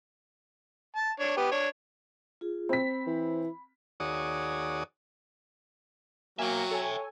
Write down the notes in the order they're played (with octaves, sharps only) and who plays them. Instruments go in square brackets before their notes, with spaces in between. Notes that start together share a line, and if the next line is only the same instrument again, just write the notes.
[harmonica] A5
D4 C#5
B3 G4
D4 C#5
[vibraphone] F4 G#4
[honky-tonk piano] C4 B6 [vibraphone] B5
[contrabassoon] E3
[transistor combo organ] D#2 F#4 G#4 C#5 D5 D#6
[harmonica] F#3 [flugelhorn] A#3 [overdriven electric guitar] E5 G5 [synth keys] G#5
[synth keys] A4 G#5 [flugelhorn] C#5